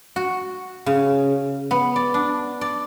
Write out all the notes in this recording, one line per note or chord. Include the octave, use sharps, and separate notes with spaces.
F#4
C#3
B3
D5
D4
D5